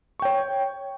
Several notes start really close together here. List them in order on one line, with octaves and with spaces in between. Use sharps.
C#6 G5 C#5